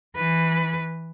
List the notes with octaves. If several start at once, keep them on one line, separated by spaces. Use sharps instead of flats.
E3 B4